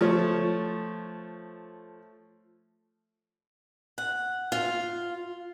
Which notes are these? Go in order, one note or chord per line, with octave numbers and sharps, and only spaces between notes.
F3 A3 C#5
F#5
F4